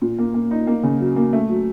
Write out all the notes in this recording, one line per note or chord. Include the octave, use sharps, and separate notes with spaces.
A#2
A#3
A#3
D#4
A#3
C#3
F#3
A#3
A3
F#3